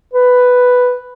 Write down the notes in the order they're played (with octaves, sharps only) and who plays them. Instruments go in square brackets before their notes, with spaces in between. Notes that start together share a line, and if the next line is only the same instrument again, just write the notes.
[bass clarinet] B4